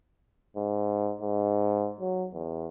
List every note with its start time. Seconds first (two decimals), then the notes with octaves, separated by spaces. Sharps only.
0.56 G#2
1.21 G#2
2.00 F#3
2.33 E2